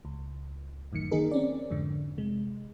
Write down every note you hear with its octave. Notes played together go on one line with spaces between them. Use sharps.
C#2
G1 F#2 A2 D#3 C#7
D#3 A#3 D#4 G#4 A#4
C4 C#4 D5
F2 G#2 D3
C3 G#3